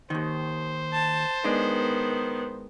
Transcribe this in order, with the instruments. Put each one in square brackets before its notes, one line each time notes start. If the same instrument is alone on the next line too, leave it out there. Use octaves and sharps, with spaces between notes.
[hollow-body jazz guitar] D#2 D#3 [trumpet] C5
[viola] A5
[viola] D#3 B3 [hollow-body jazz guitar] G#3 D4 D#4